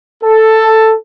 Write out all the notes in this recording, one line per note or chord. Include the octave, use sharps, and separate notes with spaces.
A4